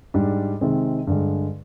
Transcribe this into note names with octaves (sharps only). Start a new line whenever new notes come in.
G#2 G3 D4
C3 D#3 G#3 C4
G2 D3 G#3